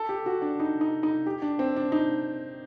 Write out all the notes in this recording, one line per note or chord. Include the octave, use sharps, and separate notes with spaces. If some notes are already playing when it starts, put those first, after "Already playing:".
Already playing: A4
G4
F#4
D4
D#4
D#4
D#4
G4
D4
C4
D4
D#4